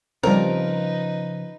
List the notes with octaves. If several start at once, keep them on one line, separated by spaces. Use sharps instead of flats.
C#3 F3 G3 C4 D#4 A#4 B4